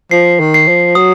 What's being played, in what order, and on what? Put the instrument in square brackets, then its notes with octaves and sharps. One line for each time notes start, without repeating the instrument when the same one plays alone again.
[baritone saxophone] F3 [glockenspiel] C7
[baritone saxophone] D#3
[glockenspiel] C7
[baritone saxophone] F3
[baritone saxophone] F#3 [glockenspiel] D#6